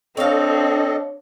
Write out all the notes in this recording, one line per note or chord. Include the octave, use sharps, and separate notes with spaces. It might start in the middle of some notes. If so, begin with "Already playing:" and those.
C4 D4 A4 C#5 D#5 F5